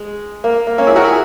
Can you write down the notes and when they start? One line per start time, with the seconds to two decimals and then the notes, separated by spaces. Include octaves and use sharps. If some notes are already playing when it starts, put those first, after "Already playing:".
Already playing: G#3
0.44 A#3
0.67 A#3
0.78 A#3 C#4
0.87 E4 G#4
0.96 F#4 A#4
1.04 E4 G#4